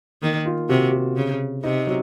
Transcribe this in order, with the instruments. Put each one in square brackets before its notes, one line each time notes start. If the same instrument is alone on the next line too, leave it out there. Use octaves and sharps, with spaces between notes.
[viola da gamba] D#3 [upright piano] A#3
[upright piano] F4
[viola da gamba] C3 [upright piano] F#4
[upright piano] F#4
[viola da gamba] C#3
[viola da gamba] C3 [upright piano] D#4
[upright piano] F#3